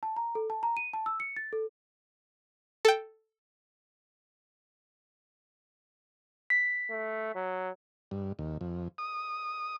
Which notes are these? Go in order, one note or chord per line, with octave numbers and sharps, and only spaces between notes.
A5
A#5
A4
A5
A#5
D#7
A5
E6
C#7
A6
A4
A4 G5
B6
A3
F#3
G2
D#2
F2
D#6